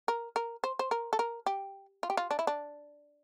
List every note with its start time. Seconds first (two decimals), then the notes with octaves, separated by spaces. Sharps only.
0.08 A#4
0.36 A#4
0.64 C5
0.79 C5
0.91 A#4
1.13 A4
1.19 A#4
1.46 G4
2.03 F4
2.10 G4
2.17 F4
2.31 D4
2.39 E4
2.47 D4